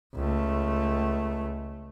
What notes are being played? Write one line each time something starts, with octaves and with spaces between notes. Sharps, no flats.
C#2 A3